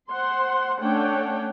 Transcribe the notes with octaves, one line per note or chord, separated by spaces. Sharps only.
C5 F#5 C6
A3 C#4 D4 C#5 F#5 G5